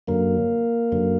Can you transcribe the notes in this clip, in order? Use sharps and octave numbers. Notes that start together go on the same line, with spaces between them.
F#2 D3 F#3 A#3 A#4
F#2 D3 F#3